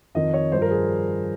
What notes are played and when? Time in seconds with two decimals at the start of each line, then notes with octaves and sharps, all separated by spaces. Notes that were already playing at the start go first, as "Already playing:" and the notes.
0.15 F2 D#3 D#5
0.34 C#5
0.52 G2 F3 C5
0.62 A#4
0.71 G#4